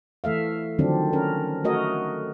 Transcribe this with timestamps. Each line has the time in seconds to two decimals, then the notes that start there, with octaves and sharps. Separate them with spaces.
0.24 E3 A3 E5 F5
0.79 D3 D#3 F3 F#3 C4 D4
1.13 C#4 A#4
1.64 A3 F#4 A#4 C#5 D#5